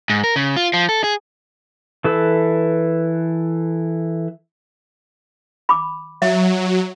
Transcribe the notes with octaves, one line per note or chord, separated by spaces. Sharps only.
G#2
A#4
C#3
F4
F3
A4
G#4
E3 A4 B4
B5 D6
F#3 E5